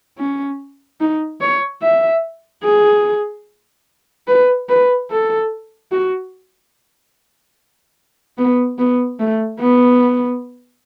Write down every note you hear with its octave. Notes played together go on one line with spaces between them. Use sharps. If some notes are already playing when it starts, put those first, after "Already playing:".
C#4
D#4
C#5
E5
G#4
B4
B4
A4
F#4
B3
B3
A3
B3